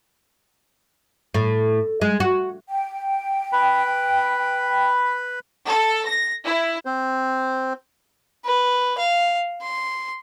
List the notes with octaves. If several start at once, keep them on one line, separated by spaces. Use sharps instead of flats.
A2
G#3
F#4
G5
B4 B5
A4
A#6
E4
C4 C5
B4
F5
C6